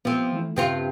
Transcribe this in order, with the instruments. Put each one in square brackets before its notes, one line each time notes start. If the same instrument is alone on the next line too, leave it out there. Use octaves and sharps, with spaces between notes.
[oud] F3 C4 [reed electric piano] B3
[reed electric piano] E3 A3 E4
[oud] G2 C4 F4 [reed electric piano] C#3